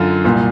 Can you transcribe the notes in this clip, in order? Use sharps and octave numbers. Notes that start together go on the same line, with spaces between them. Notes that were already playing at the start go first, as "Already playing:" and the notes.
Already playing: F#2 D3 F4
C2 A#2